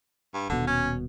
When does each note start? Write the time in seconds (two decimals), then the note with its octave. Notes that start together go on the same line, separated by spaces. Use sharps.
0.33 G2
0.49 D#1 B2 D3
0.67 C#4